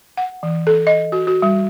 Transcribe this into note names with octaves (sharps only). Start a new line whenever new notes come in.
F#5
E3
A4
D#5
F#4
F#4
G3